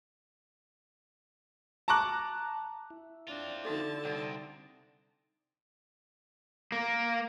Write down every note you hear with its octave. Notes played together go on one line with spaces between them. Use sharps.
A5 A#5 C#6 D6 F#6
E4
C4 D4 F4
D3 D#4 F#4 A4 A5
C2 C4 D5 F#5 A#5 D#6
A#3